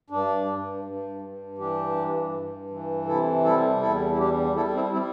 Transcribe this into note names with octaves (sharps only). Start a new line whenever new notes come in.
G2 D4
G2
G2
G2
E3 D4 G4
G2
G2
E3
C3 E4 A4
G3 E4 A4
E2 E4 A4
E4
G3 D4 G4
G3 E4 A4
C4 E4
G3 C4 E4